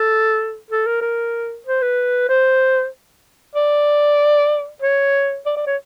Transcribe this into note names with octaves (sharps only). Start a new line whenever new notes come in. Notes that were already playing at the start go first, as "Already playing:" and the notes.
Already playing: A4
A4
A#4
A#4
C5
B4
C5
D5
C#5
D5
D5
C#5